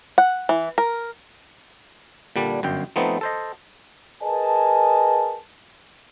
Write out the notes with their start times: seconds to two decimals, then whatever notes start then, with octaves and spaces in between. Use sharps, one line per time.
0.18 F#5
0.49 E3
0.78 A#4
2.36 A#2 D3 G3 D4
2.63 G1 F#2 G5
2.96 F3 A3 B3 C4 D#4
3.21 A4 C5 D#5
4.22 G#4 A#4 B4 D#5 G#5 A5